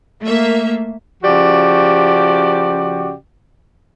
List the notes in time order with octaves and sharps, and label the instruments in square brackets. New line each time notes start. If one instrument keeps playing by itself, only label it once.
[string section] A3 A#3 E5
[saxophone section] C#3 F3 F#4 G4 D5